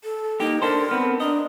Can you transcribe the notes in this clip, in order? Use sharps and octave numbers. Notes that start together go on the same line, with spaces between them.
A4
A#3 D#4 G4
D4 A4 A#4 C5
B3 C4
D4 A#4 D#5